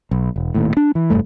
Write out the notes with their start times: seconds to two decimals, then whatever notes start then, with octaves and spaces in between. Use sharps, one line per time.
0.11 B1
0.36 E1
0.54 D#1 D#2 A2
0.77 D4
0.95 E3
1.10 F1 G2 A3